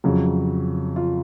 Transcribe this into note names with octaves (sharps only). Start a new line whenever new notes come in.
F2 C#3 F#3
F4